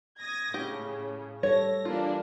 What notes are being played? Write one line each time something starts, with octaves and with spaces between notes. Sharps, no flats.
D#6 G#6 A#6
A2 C#3 G4
G3 A4 C#5 A#6
E3 A#3 D4 F4